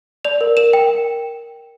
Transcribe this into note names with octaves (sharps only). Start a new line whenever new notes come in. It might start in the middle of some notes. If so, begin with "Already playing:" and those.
D5 F7
A#4
A#4 E7
G5